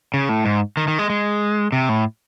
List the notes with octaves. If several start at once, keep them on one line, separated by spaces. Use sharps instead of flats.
C#3
A2
G#2
D#3
D#3
G#3
G#3
C3
A2